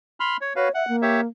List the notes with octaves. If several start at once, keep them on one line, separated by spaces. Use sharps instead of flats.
B5 C6 F6
C#5
F#4 B4 C#5 F5
E5 F#5
A#3
G4 C#5 E5